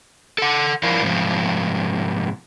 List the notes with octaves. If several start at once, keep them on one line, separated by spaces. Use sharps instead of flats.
A4 F#5
F3 E4 A#4 D5 F5
G#2 C3 F3